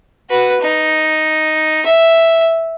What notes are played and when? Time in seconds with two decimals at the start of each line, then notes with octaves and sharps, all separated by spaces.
0.30 F#4 B4
0.61 D#4
1.86 E5